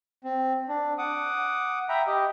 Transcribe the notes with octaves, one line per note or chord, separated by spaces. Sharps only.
C4
D4
F#5 D6 D#6
E5 G5 A#5 B5
G4 D#5